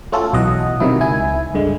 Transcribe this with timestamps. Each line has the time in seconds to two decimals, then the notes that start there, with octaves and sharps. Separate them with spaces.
0.12 A3 C#4 F4 F#4 A4
0.33 B1 B2 E3 F#3 D#5 F#5
0.80 C3 D#3 F#3 E4
1.00 C#2 E4 G#5
1.54 G2 D3 G#3